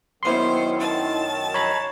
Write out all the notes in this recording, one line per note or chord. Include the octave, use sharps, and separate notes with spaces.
F#2 D#3 F#3 B3 E4 C5 C6
A5
C#5 A#5 B5